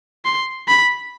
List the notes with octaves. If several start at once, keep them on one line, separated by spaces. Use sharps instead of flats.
C6
B5